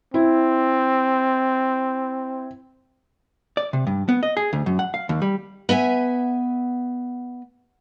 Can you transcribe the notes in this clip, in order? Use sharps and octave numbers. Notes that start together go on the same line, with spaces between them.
C4 E4
D5
C3
G2
B3
D#5
G#4
D2
F#2
F#5
F5
D#2
G3
B3 E5 F#5 G#5